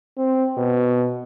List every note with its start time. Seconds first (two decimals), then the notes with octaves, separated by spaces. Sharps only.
0.17 C4
0.57 B2